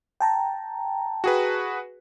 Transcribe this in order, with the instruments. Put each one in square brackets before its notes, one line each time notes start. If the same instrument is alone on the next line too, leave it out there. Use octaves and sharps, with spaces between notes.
[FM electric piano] G5 A5 A#5
[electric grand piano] F#4 G#4 B4